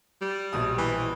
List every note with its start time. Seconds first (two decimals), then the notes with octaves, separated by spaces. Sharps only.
0.21 G3
0.53 A#1 B2 D#6
0.78 E3